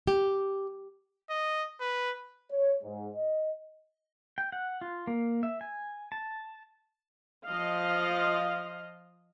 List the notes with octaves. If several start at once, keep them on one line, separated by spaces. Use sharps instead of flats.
G4
D#5
B4
C#5
G#2
D#5
G5
F#5
F4
A#3
E5
G#5
A5
F3 D#5 F5